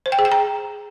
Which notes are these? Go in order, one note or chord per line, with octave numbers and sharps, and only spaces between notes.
C5
G5
G#4
G5
A#5